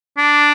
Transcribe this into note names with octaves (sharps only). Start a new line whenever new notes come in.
D4